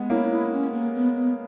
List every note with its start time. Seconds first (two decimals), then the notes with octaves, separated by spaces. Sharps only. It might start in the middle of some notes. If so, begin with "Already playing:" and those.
Already playing: G#3 B3
0.10 A#3 C#4 E4
0.31 E4
0.52 C#4
0.73 A#3
0.94 B3
1.15 B3